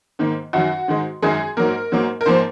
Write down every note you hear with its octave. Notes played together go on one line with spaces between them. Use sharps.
G#2 D#3 A#3
F#2 D#3 F#3 F#4
G#2 D#3 G#3
F#2 D#3 G#3 G#4
G#2 F#3 A#3 A#4
G#2 F#3 A#3
A#4
G#2 F3 A#3 C5